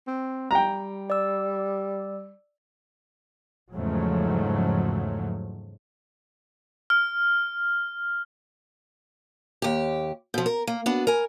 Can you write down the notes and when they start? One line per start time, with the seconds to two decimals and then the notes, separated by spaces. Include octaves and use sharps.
0.07 C4
0.51 G3 G5 A#5
1.10 D5 E6
3.73 E2 G#2 C#3 F3 F#3 A3
6.90 F6
9.62 D#2 G4
10.34 B2 F3
10.46 A#4
10.67 A#3
10.86 B3 D4 F#4
11.07 A#4 G#5